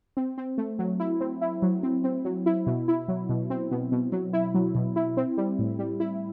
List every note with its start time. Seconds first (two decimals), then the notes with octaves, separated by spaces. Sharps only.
0.17 C4
0.38 C4
0.58 A3
0.79 F#3
1.00 E4
1.21 C4
1.41 E4
1.62 F#3
1.83 C4
2.04 C4
2.25 F#3
2.46 E4
2.67 B2
2.88 E4
3.08 F#3
3.29 B2
3.50 C4
3.71 B2
3.92 B2
4.12 F#3
4.33 E4
4.55 F#3
4.75 B2
4.96 E4
5.17 C4
5.37 G3
5.59 A2
5.79 G3
6.00 E4